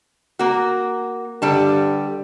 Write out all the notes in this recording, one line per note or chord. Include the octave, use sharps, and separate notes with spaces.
A#3 F#4
G2 D3 G3 A5